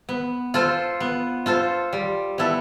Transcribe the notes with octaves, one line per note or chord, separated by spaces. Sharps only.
B3
F4 A4 C5
B3
F4 A4 C5
G3
B3 E4 A4